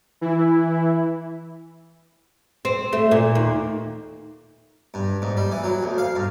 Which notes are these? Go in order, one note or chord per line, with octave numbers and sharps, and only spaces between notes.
E3 E4
C4
A3
A#2
D#2
G2
G#2
G3
E3
F#3
D2
F5
G2